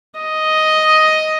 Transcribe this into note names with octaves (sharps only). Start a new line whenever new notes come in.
D#5